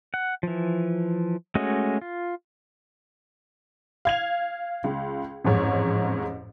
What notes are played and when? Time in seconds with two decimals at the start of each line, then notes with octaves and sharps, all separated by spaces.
0.14 F#5
0.43 E3 F3
1.55 G#3 A3 C#4 F#4 D#5
2.01 F4
4.05 F5 G#6 F7
4.84 C#2
5.44 A1 F2 G#2 C#5